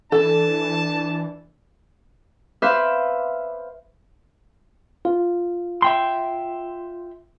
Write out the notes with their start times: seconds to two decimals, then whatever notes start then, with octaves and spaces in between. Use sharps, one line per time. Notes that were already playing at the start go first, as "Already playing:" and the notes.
0.12 E3 D4 A4 A5
2.62 B4 C5 E5 F5 D6
5.05 F4
5.82 E5 G5 C6